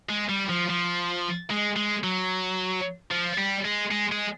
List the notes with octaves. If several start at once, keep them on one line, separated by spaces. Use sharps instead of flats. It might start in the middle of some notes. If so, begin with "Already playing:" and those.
G#3
G3
F3
F3
G#3
G#3
F#3
F3
G3
G#3
G#3
G#3